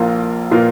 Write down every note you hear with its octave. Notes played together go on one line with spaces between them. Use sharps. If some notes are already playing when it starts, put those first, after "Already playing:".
Already playing: A#1 A#2 A#3 F4 A#4
A#2 A#3 F4 A#4